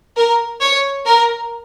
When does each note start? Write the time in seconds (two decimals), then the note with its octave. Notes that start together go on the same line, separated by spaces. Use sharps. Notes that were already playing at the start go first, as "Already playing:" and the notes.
0.17 A#4
0.61 C#5
1.06 A#4